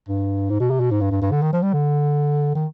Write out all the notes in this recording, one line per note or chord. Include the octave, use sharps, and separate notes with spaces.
G2
G#2
B2
C3
B2
G#2
G2
G2
G2
D3
D#3
F3
G3
D3
D#3